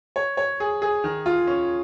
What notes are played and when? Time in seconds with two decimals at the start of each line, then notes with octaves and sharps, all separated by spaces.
0.16 C#5
0.37 C#5
0.60 G#4
0.82 G#4
1.04 D#3
1.26 F4
1.47 C#4